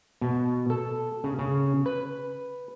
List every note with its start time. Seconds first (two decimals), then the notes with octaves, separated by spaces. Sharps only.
0.21 B2
0.70 A4
1.24 C#3
1.39 C#3
1.86 B4